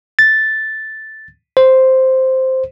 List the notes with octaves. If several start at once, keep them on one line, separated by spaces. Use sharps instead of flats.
A6
C5